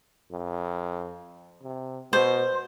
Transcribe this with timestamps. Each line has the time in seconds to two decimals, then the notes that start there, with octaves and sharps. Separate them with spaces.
0.31 F2
1.63 C3
2.13 B2 C5